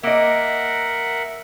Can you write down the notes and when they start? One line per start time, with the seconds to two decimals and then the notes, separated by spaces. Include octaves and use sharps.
0.03 A#3 A#4 D#5 E5 F#5